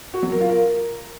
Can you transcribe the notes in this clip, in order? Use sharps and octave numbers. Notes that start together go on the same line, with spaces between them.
F#4
F#3
A#4
F4
A#4